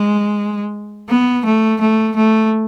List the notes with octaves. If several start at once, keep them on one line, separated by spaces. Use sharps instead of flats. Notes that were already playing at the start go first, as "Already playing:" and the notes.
Already playing: G#3
B3
A3
A3
A3